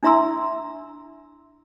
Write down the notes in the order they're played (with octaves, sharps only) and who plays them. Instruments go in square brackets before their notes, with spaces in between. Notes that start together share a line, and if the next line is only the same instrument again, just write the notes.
[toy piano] D4 E4 E5 A#5 C6 E6